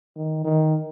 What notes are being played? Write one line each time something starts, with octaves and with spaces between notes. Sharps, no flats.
D#3
D#3